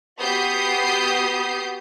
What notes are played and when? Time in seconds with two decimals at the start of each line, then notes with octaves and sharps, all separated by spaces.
0.19 B3 F#4 G4 D#6 G6 C7